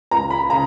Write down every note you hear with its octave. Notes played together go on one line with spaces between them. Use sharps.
C#2 A#5
B5
C#3 A#5